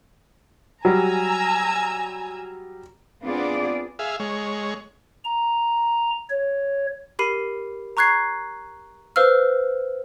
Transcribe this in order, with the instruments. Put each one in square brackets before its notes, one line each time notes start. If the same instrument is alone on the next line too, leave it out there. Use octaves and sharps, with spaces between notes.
[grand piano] F#3 G3 [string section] G#5 A#5 E6
[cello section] B3 C4 D4 F4 G#4 D5
[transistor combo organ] G#4 E5 F5
G#3 C#5
[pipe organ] A#5
C#5
[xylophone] G4 A#4 B5 C7 D#7
A#5 C#6 F#6 G#6 C7
B4 C5 F5 E6 F6